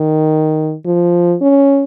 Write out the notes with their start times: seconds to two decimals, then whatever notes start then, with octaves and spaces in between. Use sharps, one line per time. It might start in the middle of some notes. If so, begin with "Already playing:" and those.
Already playing: D#3
0.86 F3
1.42 C#4